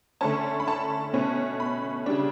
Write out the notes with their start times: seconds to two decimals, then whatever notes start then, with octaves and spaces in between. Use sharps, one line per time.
0.21 D3 A3 C#4 A5
0.60 B5
0.68 A5
1.14 B2 A3 C#4
1.60 B5
2.06 C#3 G3 D4